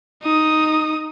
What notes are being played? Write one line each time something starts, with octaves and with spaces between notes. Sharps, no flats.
D#4 D#6